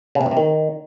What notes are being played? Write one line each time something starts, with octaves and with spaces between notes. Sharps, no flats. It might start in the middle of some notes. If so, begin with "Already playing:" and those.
C#3
C3
G2
C3
D#3